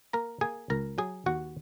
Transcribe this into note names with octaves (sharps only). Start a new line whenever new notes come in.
A#3 A#4 A#5
A#3 G#4 G#5
C#2 A#4 A#5
F#3 G#4 G#5
D#2 F#4 F#5